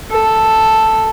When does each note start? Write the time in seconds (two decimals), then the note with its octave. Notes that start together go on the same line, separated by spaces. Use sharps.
0.11 A4